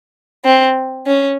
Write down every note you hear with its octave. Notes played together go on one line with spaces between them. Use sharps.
C4
C#4